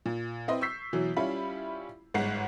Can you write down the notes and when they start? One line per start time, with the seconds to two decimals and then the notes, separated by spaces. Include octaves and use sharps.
0.06 A#2
0.48 C4 E4 B4 D#5 C6
0.61 C#6 E6 G6 B6 C7
0.93 B2 E3 F#3
1.17 G3 C#4 E4 F4 B5
2.14 G1 G#2 F#5 C7